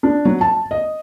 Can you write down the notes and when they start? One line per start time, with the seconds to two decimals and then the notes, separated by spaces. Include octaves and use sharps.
0.03 D4
0.25 F#3
0.41 A5
0.71 D#5